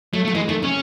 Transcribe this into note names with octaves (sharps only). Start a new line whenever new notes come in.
F#3 A3
A3
F#3
E3 G#3
D#3 A3
C3 C#4